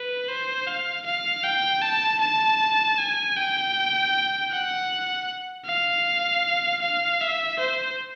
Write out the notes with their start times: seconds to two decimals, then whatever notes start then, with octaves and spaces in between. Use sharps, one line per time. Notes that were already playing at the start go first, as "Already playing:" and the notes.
Already playing: B4
0.28 C5
0.67 F5
1.06 F5
1.44 G5
1.82 A5
2.21 A5
2.98 G#5
3.36 G5
4.51 F#5
5.66 F5
6.82 F5
7.21 E5
7.59 C5